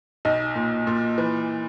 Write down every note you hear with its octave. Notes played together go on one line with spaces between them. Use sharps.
B1 D#4
A#2
A#2
E3